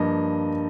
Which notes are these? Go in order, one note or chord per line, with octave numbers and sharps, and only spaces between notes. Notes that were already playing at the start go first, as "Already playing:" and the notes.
Already playing: G2 F3 A#3 D#5